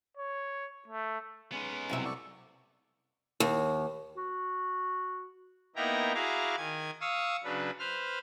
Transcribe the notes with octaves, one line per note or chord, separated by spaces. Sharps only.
C#5
A3
G#3 B3 C#4 D#4
C2 F#2 C3 E5
A4 D5 C#6
D#2
F#4
A#3 B3 D#4 E4 G5 A#5
E4 F#4 G#4 F5 A#5 D6
D#3 G#5 G#6
F5 C#6 D#6 E6
C#3 F#3 D4 B4
B4 C5 F6